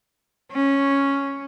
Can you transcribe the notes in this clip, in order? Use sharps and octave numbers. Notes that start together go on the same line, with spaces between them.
C#4